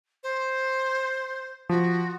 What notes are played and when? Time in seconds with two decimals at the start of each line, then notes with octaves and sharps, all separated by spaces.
0.23 C5
1.69 F3 F#4